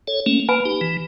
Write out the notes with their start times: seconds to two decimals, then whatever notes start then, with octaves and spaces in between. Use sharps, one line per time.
0.08 A4 C#5
0.26 A3 A#3 C#4
0.48 A#3 B4 G#5 B5
0.65 D#4 G4
0.81 E3